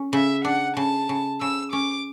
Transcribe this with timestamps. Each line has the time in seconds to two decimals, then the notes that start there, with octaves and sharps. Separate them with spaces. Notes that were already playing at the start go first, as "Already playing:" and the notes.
Already playing: C#4
0.13 C#3 E5
0.45 D4 F#5
0.77 C#3 A5
1.09 C#3
1.40 C#3 E6
1.72 C#4 D6